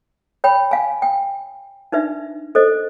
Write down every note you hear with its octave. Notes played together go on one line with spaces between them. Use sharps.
C#5 G5 B5
F5 G#5
G5
D4 D#4 B4 E5
A4 C5 D#5